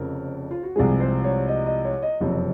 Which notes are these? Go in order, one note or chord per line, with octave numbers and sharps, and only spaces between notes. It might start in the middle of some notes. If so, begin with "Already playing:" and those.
Already playing: F1 F2 C#3 A#4
F4
F#4
C2 C3 F3 G#3 G#4
C5
C#5
D#5
D#5
C#5
D#5
F#1 F2 C3